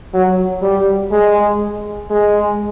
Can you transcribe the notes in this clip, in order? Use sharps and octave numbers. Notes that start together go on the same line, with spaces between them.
F#3
G3
G#3
G#3